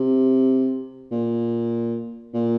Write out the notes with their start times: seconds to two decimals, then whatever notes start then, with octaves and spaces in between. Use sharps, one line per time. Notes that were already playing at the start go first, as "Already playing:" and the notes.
Already playing: C3
1.11 A#2
2.34 A#2